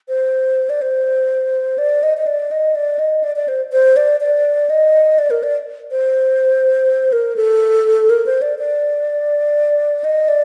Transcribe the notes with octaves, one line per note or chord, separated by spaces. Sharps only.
C5
D5
C5
D5
D#5
D#5
D5
D#5
D5
D#5
D5
D5
C5
C5
D5
D5
D#5
D5
A#4
D5
C5
A#4
A4
A#4
C5
D5
D5
D#5
D5